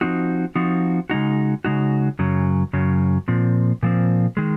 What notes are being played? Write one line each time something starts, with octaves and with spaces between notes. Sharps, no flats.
F3 C4 D#4 F#4
F3 C4 D#4 F#4
C#3 G#3 D#4 F#4
C#3 G#3 D#4 F#4
F#2 C#3 F#3
F#2 C#3 F#3
A#2 F3 C4
A#2 F3 C4
D#3 G#3